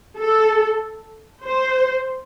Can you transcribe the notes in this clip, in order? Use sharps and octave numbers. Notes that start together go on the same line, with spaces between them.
A4
C5